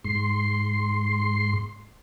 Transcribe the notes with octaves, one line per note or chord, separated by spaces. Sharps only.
G#2 C6